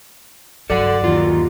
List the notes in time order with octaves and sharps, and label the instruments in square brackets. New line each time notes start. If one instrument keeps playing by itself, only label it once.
[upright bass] G2 F#3 [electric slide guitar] A4 F#5 [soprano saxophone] D5
[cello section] D#2 [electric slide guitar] F4